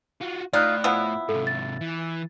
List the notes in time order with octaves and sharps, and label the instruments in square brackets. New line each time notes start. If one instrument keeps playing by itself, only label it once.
[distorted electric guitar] F4 F#4
[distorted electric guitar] A2 [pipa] D#4 F4 [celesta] D5 F#6
[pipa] F3 B3 E4
[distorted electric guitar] G#2 C3 [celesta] A4
[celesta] A6
[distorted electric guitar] E3